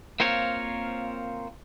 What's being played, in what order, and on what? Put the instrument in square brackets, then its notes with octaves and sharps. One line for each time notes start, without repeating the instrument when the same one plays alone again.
[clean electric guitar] A#3 C4 F4 A#4 C5 C#5